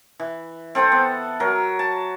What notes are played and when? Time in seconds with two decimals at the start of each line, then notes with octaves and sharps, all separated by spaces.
0.20 E3
0.75 C4 A4 C5 F#5
0.92 B3
1.40 F#3 A#4
1.79 A5